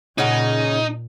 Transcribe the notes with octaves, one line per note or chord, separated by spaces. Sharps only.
A#2 C#3 C#4 D#4 F#5